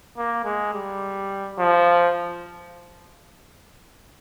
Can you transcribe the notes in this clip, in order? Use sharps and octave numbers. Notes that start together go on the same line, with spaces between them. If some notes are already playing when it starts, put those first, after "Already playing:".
A#3
G#3
G3
F3